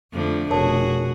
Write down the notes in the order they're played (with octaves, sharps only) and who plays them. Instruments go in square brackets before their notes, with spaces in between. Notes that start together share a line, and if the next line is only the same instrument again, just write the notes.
[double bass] F2 [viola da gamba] D3 F3 A3
[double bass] F1 B2 [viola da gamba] F#4 G#4 [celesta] A#4 C#5 A5